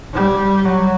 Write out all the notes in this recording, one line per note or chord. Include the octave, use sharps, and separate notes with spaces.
G3
F#3